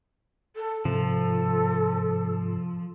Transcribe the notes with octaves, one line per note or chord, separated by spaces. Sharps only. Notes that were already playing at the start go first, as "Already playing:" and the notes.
A4
G#2 C3 F3 A4